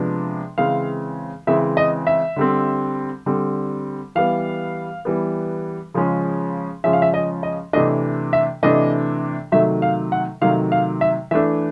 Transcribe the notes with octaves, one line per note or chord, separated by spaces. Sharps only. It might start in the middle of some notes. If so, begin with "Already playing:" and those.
Already playing: C3 F3 G#3 B3 D4
C#3 E3 G#3 C4 F5
C#3 E3 G#3 C4 E5
D#5
E5
D3 G3 C4
D3 G3 C4
E3 G3 B3 F5
E3 G3 B3
C#3 F3 G#3 C#4
C#3 F3 G#3 C#4 E5
F5
E5
D#5
D#5
C3 E3 A3 D4 D#5
E5
C3 E3 A3 D4 D#5
C3 D#3 F#3 A3 E5
F5
F#5
C3 D#3 F#3 A3 F5
F5
E5
E3 A3 D4 E5